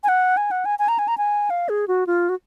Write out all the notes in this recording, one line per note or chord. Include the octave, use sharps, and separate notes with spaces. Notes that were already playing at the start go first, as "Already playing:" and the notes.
G#5
F#5
G#5
F#5
G#5
G#5
A#5
G#5
A#5
G#5
F5
G#4
F#4
F4
F#4